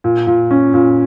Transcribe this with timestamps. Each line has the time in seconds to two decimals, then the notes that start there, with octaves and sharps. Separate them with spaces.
0.04 A#2
0.27 A#2
0.51 C#4
0.74 A#2